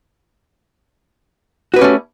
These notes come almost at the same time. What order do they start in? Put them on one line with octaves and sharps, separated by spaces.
F#4 B4 G4 C#4 A3